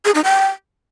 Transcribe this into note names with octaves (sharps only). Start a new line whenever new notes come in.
G#4
D#4
G5